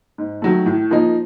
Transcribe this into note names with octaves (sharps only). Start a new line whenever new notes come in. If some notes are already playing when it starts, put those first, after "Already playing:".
G#2
D#3 F#3 A3
A2
F3 A#3 D#4